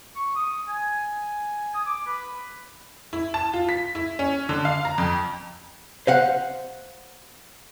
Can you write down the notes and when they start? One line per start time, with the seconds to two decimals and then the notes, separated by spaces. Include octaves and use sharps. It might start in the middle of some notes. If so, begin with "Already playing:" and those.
0.15 C#6
0.35 D#6
0.69 G#5
1.74 D#6
1.86 D6
2.07 B4
3.13 E4
3.34 A5
3.54 F4
3.69 B6
3.95 E4
4.19 C#4
4.49 D3
4.65 F5
4.85 A#5
4.98 F2
6.07 C5 F5 F#5